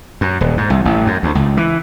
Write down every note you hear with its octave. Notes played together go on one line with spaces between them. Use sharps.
F#2
D#1
G#2
C2
A1
F#2
D2
C#2
E3